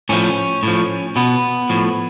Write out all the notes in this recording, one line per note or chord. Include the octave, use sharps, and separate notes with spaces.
A2 F3 C#4
A2 F3
B2 B3
A2 F3